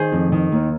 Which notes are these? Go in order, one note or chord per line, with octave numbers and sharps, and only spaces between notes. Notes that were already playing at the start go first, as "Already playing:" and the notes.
Already playing: D#3 G#4 C5
F2
D#3
D#2